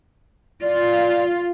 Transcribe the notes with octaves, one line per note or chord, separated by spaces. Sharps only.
F4 D5